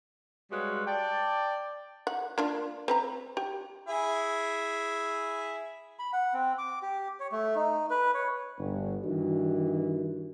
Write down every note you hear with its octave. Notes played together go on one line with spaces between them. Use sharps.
G3 G#3 F#4 B4 C#5 F5
D5 G5 A5
F#5
A#3 D4 F4
C4 B4 A#5
G4
E4 G#4
B5
F#5
C4
D6
G4
C#5
A3
D#4
B4
C#5
G1
G2 D#3 E3 D4 F#4